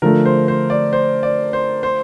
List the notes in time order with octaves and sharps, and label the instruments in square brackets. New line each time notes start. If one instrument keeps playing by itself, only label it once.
[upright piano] D3 F3 A3 [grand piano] A#4
[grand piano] C5
C5
D5
C5
D5
C5
C5